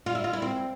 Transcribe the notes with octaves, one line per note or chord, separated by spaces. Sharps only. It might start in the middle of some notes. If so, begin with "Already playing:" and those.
F4
E4
F4
E4
C4